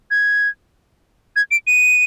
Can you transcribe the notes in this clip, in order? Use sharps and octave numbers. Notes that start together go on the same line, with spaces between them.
G#6
G#6
D7
D#7